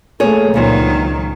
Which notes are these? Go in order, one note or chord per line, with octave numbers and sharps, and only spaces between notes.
A3 A#3 G#4 C#5
C#2 G2 A#2 D#3 F#3 C5